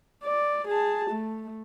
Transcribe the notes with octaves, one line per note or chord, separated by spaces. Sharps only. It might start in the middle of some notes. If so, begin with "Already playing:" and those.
D5
G#4 A5
A3